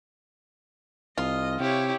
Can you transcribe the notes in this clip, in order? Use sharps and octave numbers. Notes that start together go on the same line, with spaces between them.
C2 F4 D#5
C3 E4 G4 C#5